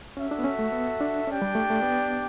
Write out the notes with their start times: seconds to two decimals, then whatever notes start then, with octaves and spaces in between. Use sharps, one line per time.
0.17 C#4 F#4 A4 E5
0.31 D4
0.39 B3
0.44 C#4
0.59 A3
0.72 B3
1.01 D4
1.28 C#4 D4 G4 D5 G5
1.42 G3
1.55 A3
1.70 A3
1.83 B3